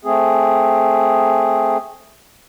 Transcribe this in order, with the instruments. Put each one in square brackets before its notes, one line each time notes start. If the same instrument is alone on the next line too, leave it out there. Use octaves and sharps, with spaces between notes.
[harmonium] A3 C4 G#4